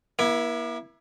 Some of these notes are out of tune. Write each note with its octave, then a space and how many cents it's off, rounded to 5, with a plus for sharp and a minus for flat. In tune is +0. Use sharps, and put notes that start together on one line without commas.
A#3 +45 E4 +0